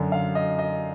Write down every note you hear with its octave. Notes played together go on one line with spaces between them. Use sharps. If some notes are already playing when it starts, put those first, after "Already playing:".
Already playing: F#2 D3
F5
D#5
D#5